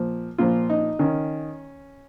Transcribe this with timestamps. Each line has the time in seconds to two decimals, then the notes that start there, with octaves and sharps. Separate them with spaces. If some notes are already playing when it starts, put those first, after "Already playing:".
Already playing: A#2 F3
0.38 A#2 F3 F4
0.70 D#4
0.99 D#3 C#4